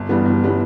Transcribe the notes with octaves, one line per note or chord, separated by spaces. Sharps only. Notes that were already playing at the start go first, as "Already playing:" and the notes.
Already playing: G1
G2 E3 G3 B3
G1
E3 G3 B3